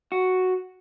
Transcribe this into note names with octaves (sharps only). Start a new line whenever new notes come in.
F#4